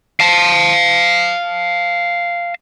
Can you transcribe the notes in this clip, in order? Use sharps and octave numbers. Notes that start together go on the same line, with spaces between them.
F5 A5